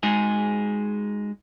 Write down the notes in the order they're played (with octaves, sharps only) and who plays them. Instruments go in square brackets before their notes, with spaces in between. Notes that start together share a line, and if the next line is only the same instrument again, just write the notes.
[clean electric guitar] G#3 D#4 F#4 G#4